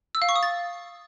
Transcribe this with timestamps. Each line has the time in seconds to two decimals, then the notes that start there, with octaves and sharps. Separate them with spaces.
0.15 E6
0.22 F5
0.29 C#6
0.36 D#6
0.43 A6